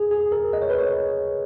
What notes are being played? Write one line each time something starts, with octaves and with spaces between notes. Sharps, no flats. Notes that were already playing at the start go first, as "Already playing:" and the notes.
Already playing: G#4
G#4
A#4
D#5
C#5
B4
C#5